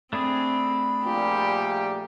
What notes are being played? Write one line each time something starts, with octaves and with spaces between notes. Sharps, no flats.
A3 C4 D4 G#4 B5
A#1 A#2 G3 G4